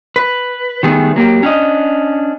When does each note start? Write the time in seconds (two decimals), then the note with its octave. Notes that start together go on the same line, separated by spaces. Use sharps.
0.16 B4
0.83 D#3 G3 A3 B3 G#4
1.16 F#3 A#3 G4
1.43 C#4 D4 D#5